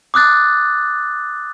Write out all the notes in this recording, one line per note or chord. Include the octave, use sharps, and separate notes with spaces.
D6 D#6 F#6 A6